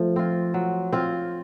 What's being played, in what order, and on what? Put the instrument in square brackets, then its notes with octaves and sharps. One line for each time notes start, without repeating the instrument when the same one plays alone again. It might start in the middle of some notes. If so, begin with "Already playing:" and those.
Already playing: [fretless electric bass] F3 A3
[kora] C4 F4
F#3
C4 F4